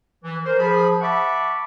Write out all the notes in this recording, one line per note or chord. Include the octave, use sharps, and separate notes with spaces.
E3
A#4 C5
F3 G#4 B5
E5 F#5 A5 B5 C#6 D6